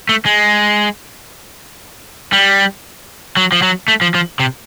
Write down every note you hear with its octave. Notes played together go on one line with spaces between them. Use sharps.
A3
G#3
G3
F#3
F3
F#3
A3
F3
F3
C3